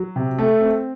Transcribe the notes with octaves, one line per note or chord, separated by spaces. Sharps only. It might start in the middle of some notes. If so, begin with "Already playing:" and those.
Already playing: F#3
C3
A3
C4